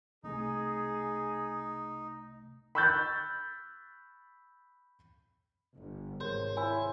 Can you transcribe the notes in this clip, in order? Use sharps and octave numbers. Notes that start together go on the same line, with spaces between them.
C2 C3 A3 D#4 G#4
B5 C#6 E6 F#6 G6 A6
G1
G#1 C3 G#4 A#4 C5 C#5
E4 C#5 G#5